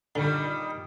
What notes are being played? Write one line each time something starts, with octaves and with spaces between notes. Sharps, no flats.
A#2 D3 D#3 G3